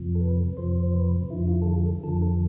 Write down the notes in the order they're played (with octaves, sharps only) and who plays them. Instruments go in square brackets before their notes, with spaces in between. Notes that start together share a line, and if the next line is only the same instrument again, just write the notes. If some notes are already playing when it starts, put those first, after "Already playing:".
Already playing: [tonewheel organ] F2 C3 F3
A4
B4
F2 C3 F3 C5
C5
C5
B4
F2 D3 F3 E4
E4
F4
A4
G#4
A4
F2 D3 F3 A4
A4